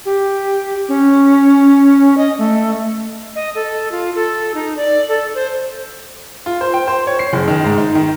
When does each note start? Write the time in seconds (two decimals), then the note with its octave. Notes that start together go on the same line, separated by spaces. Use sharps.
0.06 G4
0.89 C#4
2.18 D#5
2.38 A3
3.36 D#5
3.55 A4
3.92 F4
4.15 A4
4.55 D#4
4.76 D5
5.09 A4
5.35 C5
6.46 F4
6.61 C5
6.74 G5
6.88 C5
7.07 C#5
7.19 C7
7.33 F#1
7.48 D#3
7.64 G#2
7.78 D#4
7.95 D#3